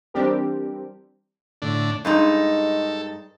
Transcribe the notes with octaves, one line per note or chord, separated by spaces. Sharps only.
E3 G3 C4 D4 G4 A#4
A2 D3 D4
G2 G#3 D#4 A4